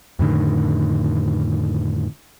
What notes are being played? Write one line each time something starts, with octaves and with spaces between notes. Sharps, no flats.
F2 A2 D3 D#3